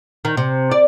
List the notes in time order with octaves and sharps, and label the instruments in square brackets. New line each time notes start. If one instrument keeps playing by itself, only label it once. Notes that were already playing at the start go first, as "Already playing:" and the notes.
[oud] D#3
C3
D5